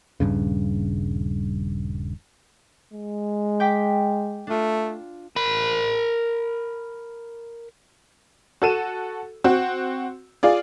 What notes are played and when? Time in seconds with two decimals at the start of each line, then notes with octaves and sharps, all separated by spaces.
0.20 D#1 A#1 G2 C#3
2.93 G#3
3.60 G5 D6 B6
4.47 A3 D4 F4
5.36 A#4 B5
8.62 F#4 A4 D#7 E7
9.44 C4 F#4
10.43 F4 G#4 D5